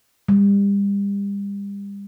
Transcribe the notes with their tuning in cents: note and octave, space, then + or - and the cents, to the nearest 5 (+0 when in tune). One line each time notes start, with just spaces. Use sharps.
G3 +35